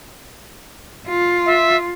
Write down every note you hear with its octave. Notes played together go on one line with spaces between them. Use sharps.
F4
E5